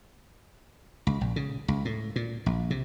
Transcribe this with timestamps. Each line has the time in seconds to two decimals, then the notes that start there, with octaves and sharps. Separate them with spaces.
1.07 C#2
1.21 A#1
1.36 C#3
1.68 C#2
1.85 A2
2.16 A#2
2.46 A#1
2.70 C3